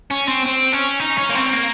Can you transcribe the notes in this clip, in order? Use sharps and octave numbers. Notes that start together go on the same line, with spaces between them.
C#4
C4
C4
C#4
D#4
C#4
A#3
C4
A#3